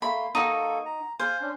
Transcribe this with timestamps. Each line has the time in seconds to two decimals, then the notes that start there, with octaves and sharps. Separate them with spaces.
0.02 A3 A#3 B5 C6
0.35 A#3 D#4 F#4 A4 C#6
0.85 A#5
1.20 C5 F5 G#5
1.41 C#4 D4